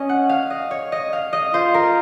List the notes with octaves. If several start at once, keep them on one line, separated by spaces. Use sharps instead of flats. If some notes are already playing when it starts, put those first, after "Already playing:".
Already playing: C#4 D#5
F#5
F5
D#5
C#5
D#5
F5
D#5
F4 C5
A#4